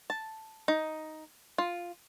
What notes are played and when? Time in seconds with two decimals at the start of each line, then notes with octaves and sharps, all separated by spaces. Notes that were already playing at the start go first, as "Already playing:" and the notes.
0.10 A5
0.68 D#4
1.58 F4